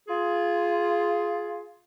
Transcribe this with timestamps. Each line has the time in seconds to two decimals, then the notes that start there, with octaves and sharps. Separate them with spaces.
0.08 F4 G#4